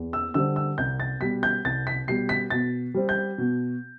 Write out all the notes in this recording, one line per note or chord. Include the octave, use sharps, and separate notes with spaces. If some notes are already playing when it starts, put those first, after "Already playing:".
Already playing: E2
E6
D3 G3 C4 E6
E6
C2 G6
A6
B2 G3 B6
G6
C2 A6
B6
B2 G3 C7
B6
B2 A6
G3 C4
G6
B2